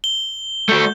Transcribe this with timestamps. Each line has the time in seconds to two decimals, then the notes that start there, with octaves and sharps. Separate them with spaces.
0.04 G7
0.69 A3 F#4 G6